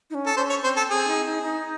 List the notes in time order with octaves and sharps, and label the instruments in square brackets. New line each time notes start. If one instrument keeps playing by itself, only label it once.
[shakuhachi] D#4
C#4
[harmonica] A4
[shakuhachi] C#4 [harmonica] C5
[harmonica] C#5
[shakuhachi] C4 [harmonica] C5
[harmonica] A4
[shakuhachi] C4 [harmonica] G#4
[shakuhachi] D#4
D#4
D#4